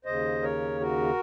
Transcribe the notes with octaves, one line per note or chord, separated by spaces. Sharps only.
D#2 C#3 C5 D#5
A#4 C#5
F#4 A#4